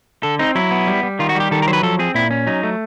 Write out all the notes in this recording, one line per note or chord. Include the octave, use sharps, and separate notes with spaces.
D3 A4
C4 D#4
F#3 E4
B3
G3
G3
D#3 F4
F#4
G3 G4
D#3 A4
A#4
F#3 C5
B4
F3 A4
C4 G#4
A#2 E4
C#4
F#3 D#4
A3